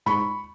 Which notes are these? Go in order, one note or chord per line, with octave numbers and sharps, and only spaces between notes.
G#2 B5 C#6